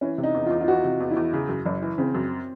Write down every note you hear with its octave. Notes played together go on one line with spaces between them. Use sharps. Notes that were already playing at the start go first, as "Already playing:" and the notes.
E3 C#4
C3
D#4
E2
F4
E2
F4
E3 F#4
C3
E2
E4
E2
C#3
F#2
F#1
E3
C#3 C4
F#2